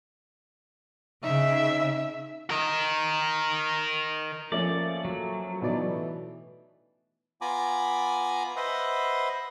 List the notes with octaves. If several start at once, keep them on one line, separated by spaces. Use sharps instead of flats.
C#3 D#4 E5
A#4 D#5
F3 A3 A#3 C#4 D5
F#3
B2 E3 D#4 D5
B3 F4 G#5 A#5 B5 D6
B4 C5 D#5 E5 F#5